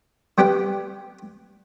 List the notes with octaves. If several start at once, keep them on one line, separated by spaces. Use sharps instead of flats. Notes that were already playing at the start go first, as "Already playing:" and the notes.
G3 B3 G4 F#5 G5